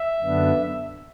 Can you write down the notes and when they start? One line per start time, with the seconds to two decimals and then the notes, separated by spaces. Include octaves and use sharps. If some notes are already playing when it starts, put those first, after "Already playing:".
Already playing: E5
0.22 F#2 D3 B3 D4